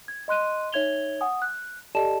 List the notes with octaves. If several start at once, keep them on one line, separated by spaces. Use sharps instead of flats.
G#6
D#5 C6 F#6 D#7
D#4 C#5 E5 G#6 F7 G7
F#5 G#5 D#6
F#6
G4 A4 D5 D#5 A5 E7